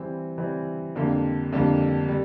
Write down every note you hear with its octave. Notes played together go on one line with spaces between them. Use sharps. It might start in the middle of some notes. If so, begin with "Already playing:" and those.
Already playing: E3 G3 C4
E3 G3 C4
F2 D3 G3 A#3
F2 D3 G3 A#3
G3